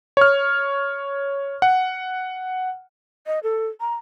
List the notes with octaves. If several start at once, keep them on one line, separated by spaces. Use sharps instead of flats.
C#5 F6
F#5
D#5
A4
A#5